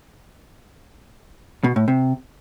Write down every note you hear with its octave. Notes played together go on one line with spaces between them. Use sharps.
B2
A2
C3